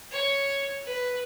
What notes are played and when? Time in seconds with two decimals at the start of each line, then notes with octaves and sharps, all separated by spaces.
0.12 C#5
0.86 B4